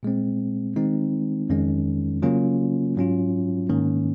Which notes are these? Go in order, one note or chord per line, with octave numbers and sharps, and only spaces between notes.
A#2 G#3 C4
D#3 G#3 C4 D#4
F2 D#3 G#3 C#4
C#3 F#3 A#3 C#4 F4
G#2 F#3 C#4 F4
G#2 D#3 A#3 C#4